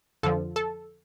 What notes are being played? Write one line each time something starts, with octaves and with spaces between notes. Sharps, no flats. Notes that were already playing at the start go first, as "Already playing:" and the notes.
F2 D3 F3 A4
A4